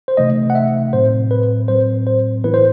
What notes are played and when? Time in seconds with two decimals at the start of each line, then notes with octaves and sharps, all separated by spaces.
0.08 C5
0.17 C3 E3 A3 D#4 D#5
0.50 F#5
0.55 E5
0.93 A2 F#3 C4 C5
1.31 B4
1.68 A2 F#3 C4 C5
2.07 C5
2.44 A2 E3 B3 E4 B4
2.54 C5